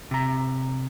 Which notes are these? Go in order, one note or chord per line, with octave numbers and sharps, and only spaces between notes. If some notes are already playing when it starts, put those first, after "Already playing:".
C3 A#5